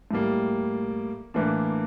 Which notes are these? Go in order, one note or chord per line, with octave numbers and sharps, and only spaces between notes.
A2 G3 A#3
A2 E3 A#3 D4